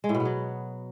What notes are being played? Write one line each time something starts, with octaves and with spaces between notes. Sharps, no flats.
G#3
A2
B2
B3
F#3